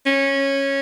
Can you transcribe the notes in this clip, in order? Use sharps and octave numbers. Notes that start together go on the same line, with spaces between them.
C#4